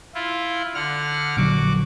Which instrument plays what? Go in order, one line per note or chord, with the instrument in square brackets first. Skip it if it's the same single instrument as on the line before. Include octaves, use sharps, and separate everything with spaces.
[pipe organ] E4 F4
D3 F#5 F6
[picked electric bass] A#1 D3 F#3 [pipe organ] F#4 D6